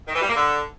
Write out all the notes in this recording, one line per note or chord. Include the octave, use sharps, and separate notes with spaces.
D#3
E3
G3
A#3
D3